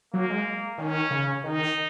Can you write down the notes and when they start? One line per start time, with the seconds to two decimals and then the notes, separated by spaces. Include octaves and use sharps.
0.13 F#3 A#3
0.30 G#3
0.78 D#3 C#4
1.11 C#3
1.44 D#3 D#4